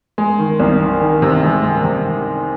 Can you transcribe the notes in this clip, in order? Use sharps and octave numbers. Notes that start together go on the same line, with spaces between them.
G#3
D#3
C2
D#3
D#3
C3
G#3
G#3
C3